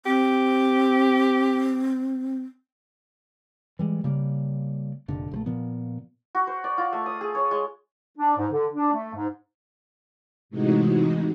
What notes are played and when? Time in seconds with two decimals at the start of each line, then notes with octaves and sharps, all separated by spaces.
0.06 C4 G4
3.79 E3 G3 G#3
4.04 C#3 G3 A#3
5.08 F1 A#2 D3
5.31 A#1 F3 A3
5.46 A#2 F3 B3
6.35 F#4
6.47 C5
6.64 D5
6.78 F4
6.93 A3
7.06 D#6
7.21 G#4
7.35 C#5
7.51 G#3
8.18 D4
8.37 G#2
8.51 D3
8.73 D4
8.93 A3
9.14 G#2
10.49 A2 C3 E3 G#3 D#4 F#4